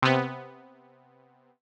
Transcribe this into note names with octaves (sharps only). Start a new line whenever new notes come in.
C3 B3